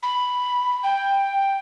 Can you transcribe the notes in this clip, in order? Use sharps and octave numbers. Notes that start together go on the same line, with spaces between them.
B5
G5